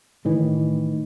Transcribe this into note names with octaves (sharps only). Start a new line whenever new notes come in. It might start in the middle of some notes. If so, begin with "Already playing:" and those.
A2 D#3 E3